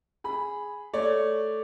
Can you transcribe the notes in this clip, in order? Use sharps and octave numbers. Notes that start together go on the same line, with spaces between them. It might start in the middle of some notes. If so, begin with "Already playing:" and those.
G#4 B5
A3 C#5 D5